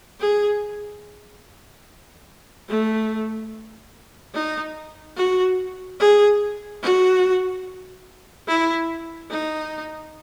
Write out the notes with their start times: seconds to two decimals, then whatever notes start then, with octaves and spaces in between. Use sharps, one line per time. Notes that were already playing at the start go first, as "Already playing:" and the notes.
0.20 G#4
2.68 A3
4.34 D#4
5.16 F#4
5.99 G#4
6.82 F#4
8.47 E4
9.30 D#4